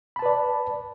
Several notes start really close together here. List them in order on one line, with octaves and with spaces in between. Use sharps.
B5 A5 B4 D5